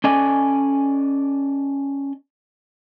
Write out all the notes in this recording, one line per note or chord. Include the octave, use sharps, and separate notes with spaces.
C#4 A4 D5 D#5 G#5